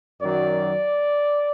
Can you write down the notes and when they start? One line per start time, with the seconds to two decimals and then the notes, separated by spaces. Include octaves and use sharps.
0.20 F#2 D#3 F#3 D5